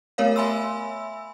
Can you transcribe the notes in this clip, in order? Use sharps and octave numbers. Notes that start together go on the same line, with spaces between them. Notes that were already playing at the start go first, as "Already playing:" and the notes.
A3 B3 A#4 C#5 F5
E5 G#5 B5 C6 E6